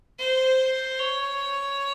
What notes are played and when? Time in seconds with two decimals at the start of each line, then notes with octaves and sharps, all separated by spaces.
0.19 C5
0.99 C#5